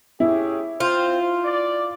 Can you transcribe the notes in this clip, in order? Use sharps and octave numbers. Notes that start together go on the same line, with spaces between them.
C#4 E4 G4 G#4
C4 F4 C5
D5